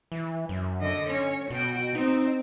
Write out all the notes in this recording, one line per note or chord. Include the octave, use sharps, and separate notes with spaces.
E3
F#2
D3 D#5
C#4 C#5
B2 F#4 G5
C4 D#4